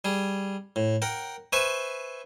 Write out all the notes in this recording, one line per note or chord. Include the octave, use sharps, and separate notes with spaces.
G3 G#4
A2
A#4 F#5 G5
B4 C5 E5 G#5 C6 C#6